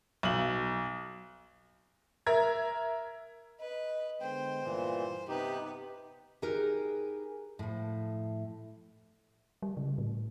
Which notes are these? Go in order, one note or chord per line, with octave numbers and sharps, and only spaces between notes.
B1 F#7
A#4 E5 A#5 G#6
B4 D#5
D3 G#3 B3 C5 G5
G2 A#2 E3
C3 B3 D#4 G4 B4
D#4 G4 G#4 A#4 B4
A2 F3
G3
C#3
A2